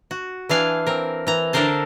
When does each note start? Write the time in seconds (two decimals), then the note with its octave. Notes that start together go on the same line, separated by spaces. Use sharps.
0.11 F#4
0.49 E3 D4 F5 G#5
0.87 C4 A#4
1.27 E3 A#5
1.53 D3 D4 A4 A#4 C5 A5